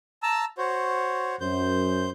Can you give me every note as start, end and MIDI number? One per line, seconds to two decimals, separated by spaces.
0.23 0.45 81
0.23 0.45 82
0.23 0.45 88
0.58 1.36 66
0.58 1.36 72
0.58 1.36 73
1.41 2.09 42
1.41 2.10 72
1.41 2.10 91